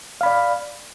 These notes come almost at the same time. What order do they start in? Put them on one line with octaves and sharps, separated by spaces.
F5 B5 D5